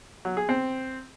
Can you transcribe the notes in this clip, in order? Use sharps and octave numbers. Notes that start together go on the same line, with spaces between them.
F#3
G#4
C4